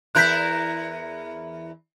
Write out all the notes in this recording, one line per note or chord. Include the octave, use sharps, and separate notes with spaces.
E2 E4 A#4 F#6 G6 B6